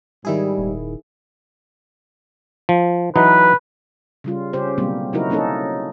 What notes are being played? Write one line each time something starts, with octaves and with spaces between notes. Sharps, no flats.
G#2 D#3 G3 E4 G#4
D#1
F3
E3 F#3 D#4 B4
C#3 G3 F4
C#3 C#4 G4 C5
B2 D3 F#3 G3 A#3 C4
C#3 F#3 D#4 E4 F#4 A#4
F#3 A#3 C#4 D#4 A4